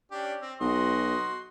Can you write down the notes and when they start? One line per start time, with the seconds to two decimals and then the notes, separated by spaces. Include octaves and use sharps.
0.12 C#4 D4 G4
0.41 C4
0.61 B1 F#4 D#5 C6